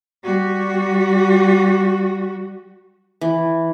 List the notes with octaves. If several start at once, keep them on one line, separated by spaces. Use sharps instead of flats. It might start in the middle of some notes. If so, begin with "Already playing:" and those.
G3 F#4
E3